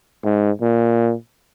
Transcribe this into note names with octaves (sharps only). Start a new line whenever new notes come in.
G#2
A#2